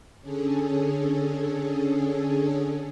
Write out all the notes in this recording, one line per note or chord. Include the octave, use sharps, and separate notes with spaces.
D3 C#4 G#4 A4